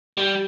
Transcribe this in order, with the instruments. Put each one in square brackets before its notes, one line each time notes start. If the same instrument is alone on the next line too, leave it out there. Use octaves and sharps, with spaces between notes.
[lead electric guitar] G3